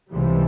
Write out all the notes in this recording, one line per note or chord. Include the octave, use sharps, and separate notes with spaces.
C#2 C3 E3 G3